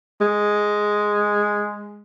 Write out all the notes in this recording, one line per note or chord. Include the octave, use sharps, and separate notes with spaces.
G#3